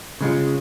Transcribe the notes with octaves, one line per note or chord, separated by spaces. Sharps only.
C#3 G#3 C#4 F4